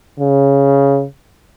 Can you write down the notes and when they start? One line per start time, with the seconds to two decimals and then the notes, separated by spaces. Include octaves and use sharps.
0.19 C#3